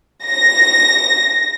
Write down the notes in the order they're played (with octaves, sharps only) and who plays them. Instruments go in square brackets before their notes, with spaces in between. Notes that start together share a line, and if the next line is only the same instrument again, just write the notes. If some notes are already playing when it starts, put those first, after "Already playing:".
[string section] A#6